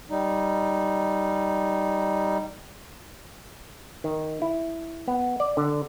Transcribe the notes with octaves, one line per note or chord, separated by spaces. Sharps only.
G3 D#4
D#3
E4
B3
D5
D3